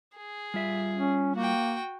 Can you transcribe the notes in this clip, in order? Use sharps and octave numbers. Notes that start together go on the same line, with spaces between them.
G#4
G3 F4 E5
C#4
A#3 F#4 G5